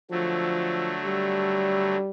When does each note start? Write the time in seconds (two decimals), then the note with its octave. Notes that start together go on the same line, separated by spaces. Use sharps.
0.11 D3 F3 F#3 A3
1.04 G3